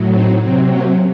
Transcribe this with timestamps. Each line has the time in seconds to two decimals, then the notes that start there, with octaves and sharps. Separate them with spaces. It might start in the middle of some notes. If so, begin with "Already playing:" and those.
Already playing: A2 F#3
0.12 C4 D#4
0.41 C3 F#3 C4
0.70 A#3 C#4